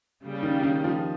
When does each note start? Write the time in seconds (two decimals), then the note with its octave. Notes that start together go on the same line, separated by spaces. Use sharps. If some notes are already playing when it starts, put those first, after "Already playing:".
0.23 C#3 G3 A#3
0.43 D#3
0.63 D#3
0.84 F3